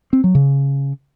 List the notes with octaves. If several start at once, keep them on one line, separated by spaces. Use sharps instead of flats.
C4
F#3
C#3